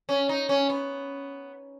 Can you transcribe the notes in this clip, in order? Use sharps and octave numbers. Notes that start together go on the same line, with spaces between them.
C#4
D#4
C#4
B3